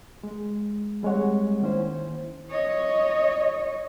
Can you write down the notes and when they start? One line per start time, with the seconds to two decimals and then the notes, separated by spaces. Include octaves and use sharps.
0.23 G#3
1.03 G3 G#3 C4 C#5 F#5
1.62 D#3 A#3 C#4 E4 C5
2.50 C#5 D#5